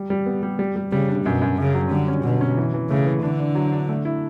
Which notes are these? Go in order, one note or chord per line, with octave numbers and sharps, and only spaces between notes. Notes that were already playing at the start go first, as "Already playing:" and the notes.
Already playing: G3
G3
B3
G3
G3
G3
C#3 G3
D4
F#2 B2
F#2
F#2 C#3
F#3
D3 G3
C#4
B2 D3
C#4
E3
E3
C#3 A3
E3
D3 D4
D4
F#3
D4
A3
E4